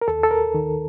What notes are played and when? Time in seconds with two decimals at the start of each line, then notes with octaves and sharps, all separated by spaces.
0.02 A#4
0.08 D#2 A4
0.23 A4
0.31 A#4
0.54 D#3